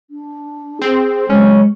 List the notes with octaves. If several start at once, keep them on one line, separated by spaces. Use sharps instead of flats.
D4
C4 G#4
F#3 G#3 C#4